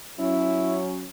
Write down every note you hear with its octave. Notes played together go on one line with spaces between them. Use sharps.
F#3 C#4 E4